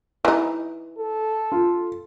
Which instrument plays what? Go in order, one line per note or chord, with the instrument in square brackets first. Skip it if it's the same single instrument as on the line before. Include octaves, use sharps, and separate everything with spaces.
[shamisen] E3 D#4
[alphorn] A4
[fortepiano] F4